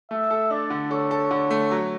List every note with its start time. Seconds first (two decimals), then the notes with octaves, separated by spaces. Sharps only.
0.11 A3 E5
0.31 A4
0.51 D4 D5
0.70 D3
0.91 A4 C#5
1.11 A4
1.31 D3
1.51 A3
1.71 F#3